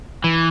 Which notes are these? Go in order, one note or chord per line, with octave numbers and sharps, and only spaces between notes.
E3